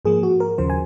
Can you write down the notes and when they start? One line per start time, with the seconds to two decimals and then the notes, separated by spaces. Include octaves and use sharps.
0.05 G#2 F3 A#3 G#4
0.23 F#4
0.40 A#4
0.58 D#2 C#3 F3 C5
0.70 G#5